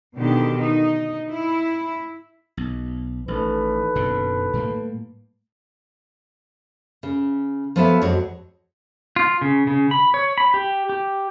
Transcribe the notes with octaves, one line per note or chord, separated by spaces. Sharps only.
B2 D3 D#3 G4
D#4
E4
B1
A1 D#3 A4 B4
F#1 B2 D3
A2 G3 A#3
C#3
F3 F#3 B3 A4 B4 E5
F2 G#3 F#4 C#5
F4
C#3
C#3
B5
C#5
B5
G4
G4